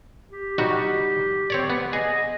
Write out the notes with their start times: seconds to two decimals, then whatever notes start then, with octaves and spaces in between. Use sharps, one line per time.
0.31 G4
0.58 G3 D#4 F#4
1.50 C4 C#5 D5
1.70 B3
1.93 G#4 D#5